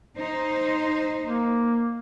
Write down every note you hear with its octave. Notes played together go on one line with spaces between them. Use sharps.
D#4 C5
A#3